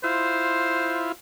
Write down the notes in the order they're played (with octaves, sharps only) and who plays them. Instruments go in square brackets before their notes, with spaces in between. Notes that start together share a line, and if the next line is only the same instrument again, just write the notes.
[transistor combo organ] E4 F4 [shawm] C5